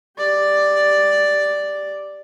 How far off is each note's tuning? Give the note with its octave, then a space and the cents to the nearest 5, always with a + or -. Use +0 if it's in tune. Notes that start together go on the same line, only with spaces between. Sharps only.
G4 +5 D5 +0